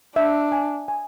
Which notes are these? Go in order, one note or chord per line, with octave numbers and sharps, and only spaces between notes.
D4 E5
G#5
G#5